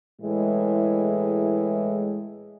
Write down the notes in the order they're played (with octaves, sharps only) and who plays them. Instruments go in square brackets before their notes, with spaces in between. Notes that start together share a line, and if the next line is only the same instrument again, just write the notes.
[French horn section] A2 E3 G#3